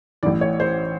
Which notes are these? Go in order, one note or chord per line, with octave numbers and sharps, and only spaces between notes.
A1 A2 E3 D5
C#5
C5